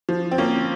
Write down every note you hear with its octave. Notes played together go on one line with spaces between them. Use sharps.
F3
C4
F3 A#3 C#4